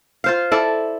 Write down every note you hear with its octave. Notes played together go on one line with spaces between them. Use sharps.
F4 C5 F5
E4 A4 D5